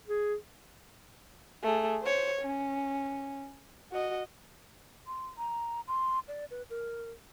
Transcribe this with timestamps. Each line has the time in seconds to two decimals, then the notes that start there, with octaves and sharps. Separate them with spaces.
0.08 G#4
1.64 A3 G#4
2.02 C5 C#5
2.42 C#4
3.92 F#4 D#5
5.07 C6
5.38 A#5
5.88 C6
6.28 D5
6.51 B4
6.70 A#4